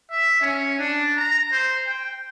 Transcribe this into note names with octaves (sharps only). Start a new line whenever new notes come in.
E5
C#4
D4
A#5
C5
G5